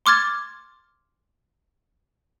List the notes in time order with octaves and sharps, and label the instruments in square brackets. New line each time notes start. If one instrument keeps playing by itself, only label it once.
[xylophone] C6 D6 F6 G#6 A6